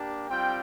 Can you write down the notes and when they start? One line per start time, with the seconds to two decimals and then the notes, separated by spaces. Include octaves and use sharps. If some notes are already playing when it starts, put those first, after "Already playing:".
Already playing: A#3 D4 G4
0.28 G3 C4 F4 G5